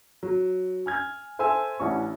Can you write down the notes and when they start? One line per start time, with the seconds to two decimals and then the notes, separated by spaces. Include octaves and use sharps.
0.23 F#3
0.86 G#5 F6 G#6
1.39 A4 C5 E5 G#5 E6
1.80 A1 C#4 D4 E4 C#6